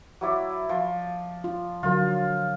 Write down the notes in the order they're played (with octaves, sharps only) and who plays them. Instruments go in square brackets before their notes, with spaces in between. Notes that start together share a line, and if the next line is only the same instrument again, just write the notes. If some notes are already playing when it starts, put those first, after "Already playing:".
[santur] F#3 E4 D5
F3
[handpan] F4
[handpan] D3 F#3 A#4 [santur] F4